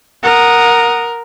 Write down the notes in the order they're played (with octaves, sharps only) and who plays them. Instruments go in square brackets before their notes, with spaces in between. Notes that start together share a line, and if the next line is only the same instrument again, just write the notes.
[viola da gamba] A#4 [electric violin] F#5 D#6